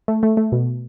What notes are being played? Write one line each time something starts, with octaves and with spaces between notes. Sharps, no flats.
A3
A3
A3
B2